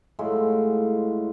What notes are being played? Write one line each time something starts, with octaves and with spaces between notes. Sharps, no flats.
A2 F#3 G#3 F4